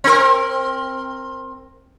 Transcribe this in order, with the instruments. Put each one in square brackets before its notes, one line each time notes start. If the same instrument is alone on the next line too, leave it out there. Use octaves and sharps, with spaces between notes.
[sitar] C4 A#4